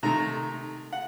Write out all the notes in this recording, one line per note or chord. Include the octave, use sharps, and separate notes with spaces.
C3 D#3 A3 A#5
F#5